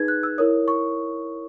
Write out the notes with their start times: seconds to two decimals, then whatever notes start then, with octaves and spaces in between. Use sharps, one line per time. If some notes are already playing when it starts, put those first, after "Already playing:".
Already playing: D#4 G#4 B4 G#6
0.08 F#6
0.23 E6
0.38 E4 A#4 C#5 D#6
0.68 C#6